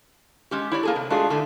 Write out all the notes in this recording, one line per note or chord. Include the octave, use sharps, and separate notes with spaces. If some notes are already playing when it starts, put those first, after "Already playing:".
G#3 C#4 G4
E4 C#5 D5
A#3 G#4 A4
C3
G#3 A3 D4 F4 F#4 G#4
A2 D3 A3